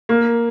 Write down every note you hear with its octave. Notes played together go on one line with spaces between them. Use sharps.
A#3